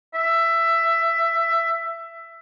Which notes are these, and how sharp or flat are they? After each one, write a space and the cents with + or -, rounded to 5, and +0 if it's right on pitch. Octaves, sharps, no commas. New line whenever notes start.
E5 +15